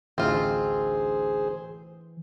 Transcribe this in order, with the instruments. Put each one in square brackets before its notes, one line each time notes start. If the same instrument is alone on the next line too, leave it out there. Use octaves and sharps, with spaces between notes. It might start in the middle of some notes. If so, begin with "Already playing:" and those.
[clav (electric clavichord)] A1 D2 D#4 [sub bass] E3 [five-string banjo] C4 F4 [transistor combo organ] G#4 C5